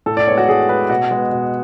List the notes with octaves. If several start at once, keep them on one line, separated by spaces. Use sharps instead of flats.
A2 A4
D5
G#3 B3 C#5
F#4
A2 G#4
G#3 B3 B4
B2 F#4
G#3 B3
B2